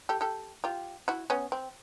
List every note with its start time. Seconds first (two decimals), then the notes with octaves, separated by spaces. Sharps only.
0.09 G4 A4
0.21 G4 A4
0.64 F4 G4
1.08 E4 F#4
1.30 B3 C#4
1.52 C4